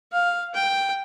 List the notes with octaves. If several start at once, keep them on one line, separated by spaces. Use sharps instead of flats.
F5
G5